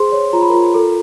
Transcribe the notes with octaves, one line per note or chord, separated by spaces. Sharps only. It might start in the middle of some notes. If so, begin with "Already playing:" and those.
Already playing: G#4 C5 C6
C#5
F4 A#5
B5
F4 A#4 A#5
A4